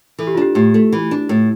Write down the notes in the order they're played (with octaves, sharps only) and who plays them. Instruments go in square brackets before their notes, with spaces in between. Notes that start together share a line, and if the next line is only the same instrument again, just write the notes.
[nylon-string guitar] E3 [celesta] A4
[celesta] G4
F4
[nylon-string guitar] D4 [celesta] G4
[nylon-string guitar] A2 [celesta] G4
[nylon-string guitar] A3
E3
D4
A2